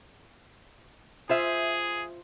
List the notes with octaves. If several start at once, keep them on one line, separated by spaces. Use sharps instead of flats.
F4 G#4 C5 E5